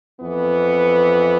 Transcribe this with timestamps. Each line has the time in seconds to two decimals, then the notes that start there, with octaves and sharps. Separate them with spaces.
0.20 F2 E3 B3